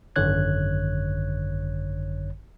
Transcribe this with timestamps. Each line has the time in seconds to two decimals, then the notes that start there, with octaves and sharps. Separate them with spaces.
0.16 G#1 F#2 D3 C#5 F#6 G#6